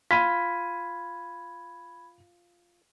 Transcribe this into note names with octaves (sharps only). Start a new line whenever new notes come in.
F4 B5 G#6 B6 D#7